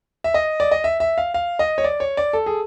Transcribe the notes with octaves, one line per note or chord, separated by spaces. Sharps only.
E5
D#5
D5
D#5
E5
E5
F5
F5
D#5
C#5
D5
C#5
D5
A4
G#4